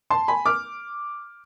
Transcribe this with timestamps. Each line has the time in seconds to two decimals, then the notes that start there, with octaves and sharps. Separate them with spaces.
0.10 A5 C6
0.28 G#5 B5
0.46 D6 F6